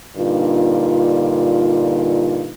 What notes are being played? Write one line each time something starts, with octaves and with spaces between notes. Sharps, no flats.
G2 A#2 D3 D#4 F4